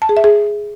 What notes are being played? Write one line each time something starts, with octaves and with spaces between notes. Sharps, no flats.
A5
G#4
E5
G#4